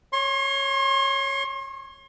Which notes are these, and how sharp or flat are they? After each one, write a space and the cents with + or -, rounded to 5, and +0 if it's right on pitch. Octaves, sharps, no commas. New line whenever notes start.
C#5 -5 C6 +40